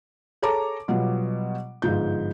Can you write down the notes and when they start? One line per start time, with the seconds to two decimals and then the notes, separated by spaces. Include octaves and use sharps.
0.42 G#4 A4 C#5 A5 A#5 D6
0.88 B2 F#3 G3 B3 F4
1.82 G1 G#2 F3 G6